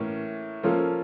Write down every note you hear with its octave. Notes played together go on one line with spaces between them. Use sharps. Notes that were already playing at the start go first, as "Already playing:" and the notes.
Already playing: A2 E3 A#3 C#4
F3 A#3 C#4 F4 A4